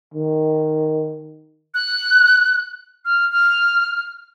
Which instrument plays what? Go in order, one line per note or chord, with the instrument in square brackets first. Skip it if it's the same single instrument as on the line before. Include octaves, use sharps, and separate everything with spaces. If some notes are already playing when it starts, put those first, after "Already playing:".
[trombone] D#3
[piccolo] F#6
F6
F6